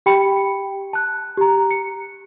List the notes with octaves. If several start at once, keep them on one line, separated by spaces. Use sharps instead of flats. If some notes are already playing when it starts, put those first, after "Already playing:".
G4 G5 B5 C#7
A5 F#6
G4 A#5
C#7